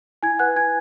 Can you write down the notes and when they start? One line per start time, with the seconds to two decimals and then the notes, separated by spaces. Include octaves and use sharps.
0.23 E4 G#5 G#6
0.39 B4 F#5 F#6
0.56 E4 G#5 G#6